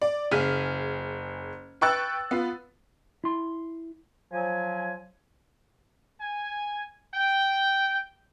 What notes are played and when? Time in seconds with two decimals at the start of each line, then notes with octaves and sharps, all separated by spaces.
0.02 D5
0.31 F#1 G#4 F6 B6 D#7
1.81 B4 G5 C#6 E6 F#6 A6
2.31 B3 F4
3.24 E4 C6
4.32 F3 F#3 G#5
6.20 G#5
7.14 G5